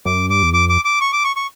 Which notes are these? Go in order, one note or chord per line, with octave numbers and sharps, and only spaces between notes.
F#2 D6
G2 D6
E2
F2 D6
D6
D6
C#6
D6
C#6
C#6